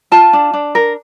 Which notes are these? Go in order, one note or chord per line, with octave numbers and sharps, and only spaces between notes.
F4 A5
D4
D4
A#4